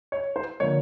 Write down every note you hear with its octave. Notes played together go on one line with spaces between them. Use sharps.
C#5
C5
D3 F3 A#3 C#5